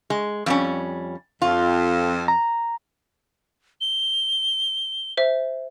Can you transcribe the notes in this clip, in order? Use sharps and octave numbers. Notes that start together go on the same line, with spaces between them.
G#3
F2 G3 C#4
F2 F4
A#5
G7
C5 E5